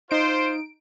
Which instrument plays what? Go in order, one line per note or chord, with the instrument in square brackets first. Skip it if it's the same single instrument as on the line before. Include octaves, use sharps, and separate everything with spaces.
[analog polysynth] D#4 D7 [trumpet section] F4 C5